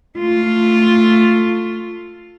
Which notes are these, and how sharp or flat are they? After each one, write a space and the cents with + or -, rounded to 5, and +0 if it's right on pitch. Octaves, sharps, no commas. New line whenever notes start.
A3 +15 F4 +0